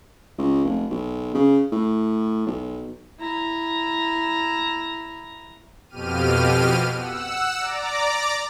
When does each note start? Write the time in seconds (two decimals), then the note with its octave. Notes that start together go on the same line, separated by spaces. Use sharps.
0.38 C#2
0.64 F1
0.91 B1
1.35 C#3
1.72 A2
2.46 B1
3.19 E4 A#5
5.89 F2 B2 G4 F6 D#7
6.97 F#5 E6
7.58 D5 A#5 D6